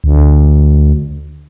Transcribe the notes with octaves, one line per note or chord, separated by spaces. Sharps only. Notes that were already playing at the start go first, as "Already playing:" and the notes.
D2